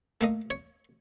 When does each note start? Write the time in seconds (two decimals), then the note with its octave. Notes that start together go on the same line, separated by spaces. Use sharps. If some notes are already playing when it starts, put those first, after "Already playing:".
0.21 A3 A#3 D#5
0.50 C#5